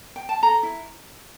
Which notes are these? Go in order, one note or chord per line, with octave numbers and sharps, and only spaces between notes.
G5
A5
A4 A#5
E4